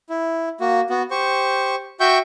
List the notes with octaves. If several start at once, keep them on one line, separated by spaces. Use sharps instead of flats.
E4
A#3 F#4
B3 F#4
G4 C5 C#6
F#4 E5 G5 C#6 G6